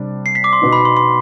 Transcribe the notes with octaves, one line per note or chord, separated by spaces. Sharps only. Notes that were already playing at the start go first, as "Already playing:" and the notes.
Already playing: C3 G3 D4
C7
B6
D6
C6
B2 B3 D#4
B5
C6
C6